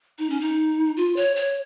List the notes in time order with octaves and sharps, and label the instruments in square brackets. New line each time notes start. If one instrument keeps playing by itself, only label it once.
[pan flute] D#4
C#4
D#4
F4
C#5
C#5